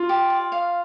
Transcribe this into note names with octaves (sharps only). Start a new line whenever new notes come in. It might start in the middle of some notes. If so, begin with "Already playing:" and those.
Already playing: F4
G4
D5
F5